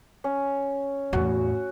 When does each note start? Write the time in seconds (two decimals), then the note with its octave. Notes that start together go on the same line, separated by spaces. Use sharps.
0.24 C#4
1.13 E2 A2 F#4